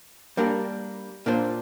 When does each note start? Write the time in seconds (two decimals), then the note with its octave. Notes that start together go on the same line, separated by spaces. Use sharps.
0.37 G3 A#3 D4 A#4 D5
1.26 A#2 A#3 D4 F4 C5